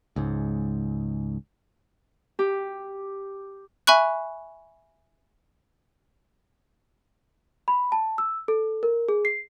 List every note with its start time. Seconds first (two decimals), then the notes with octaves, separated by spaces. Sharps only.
0.16 C#2 G#2
2.39 G4
3.87 E5 G#5 B5 C#6 F#6
7.68 B5
7.92 A5
8.18 E6
8.48 A4
8.83 A#4
9.09 G#4
9.25 C7